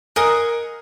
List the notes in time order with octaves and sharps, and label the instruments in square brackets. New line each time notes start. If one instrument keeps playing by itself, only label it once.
[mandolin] G#4 D#5 F#5 [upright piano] A#4